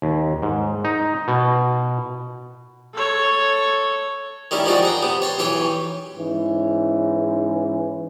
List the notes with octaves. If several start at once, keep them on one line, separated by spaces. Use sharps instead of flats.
D#2
G#2
D#4
B2
A4 C#5
D#3 G3 C#4 E4
D#3 F3 G3 D4 F#4 G#4
G#4 F#5 G5
C3 B3
C#5 A5 C6
B1 E3 G4 C#5 G#5
G#2 E3 C#4